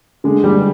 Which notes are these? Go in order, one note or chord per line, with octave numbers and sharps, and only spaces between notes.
D3 G#3
G3